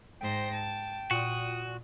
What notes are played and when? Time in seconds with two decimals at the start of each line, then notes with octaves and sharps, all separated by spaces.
0.21 G#2 C5 G5 A#6
0.54 A5
1.11 A#2 F#4 D#6